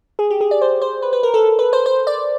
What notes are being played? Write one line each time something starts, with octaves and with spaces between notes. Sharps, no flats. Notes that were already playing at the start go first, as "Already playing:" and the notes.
G#4
G4
G#4
D5
C5
C5
B4
B4
A#4
A4
B4
C5
C5
D5